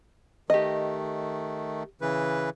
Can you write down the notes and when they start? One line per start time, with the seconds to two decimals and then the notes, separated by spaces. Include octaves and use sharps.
0.50 D#3 A3 G4 D#5
2.01 C#3 E3 B4